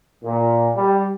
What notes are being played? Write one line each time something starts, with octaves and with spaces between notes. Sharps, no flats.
A#2
G3